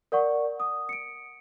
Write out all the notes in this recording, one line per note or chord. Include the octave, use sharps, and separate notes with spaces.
A#4 D5 F#5 C#6
D#6
C#7 D7